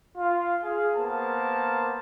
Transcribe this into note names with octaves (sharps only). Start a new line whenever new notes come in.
F4
G#4 F5
A#3 B3 A#4 C5 A5